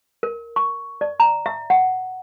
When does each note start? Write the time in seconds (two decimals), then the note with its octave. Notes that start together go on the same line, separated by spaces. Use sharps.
0.23 A#4
0.56 C#6
1.01 D5
1.20 A#5
1.46 E5
1.70 F#5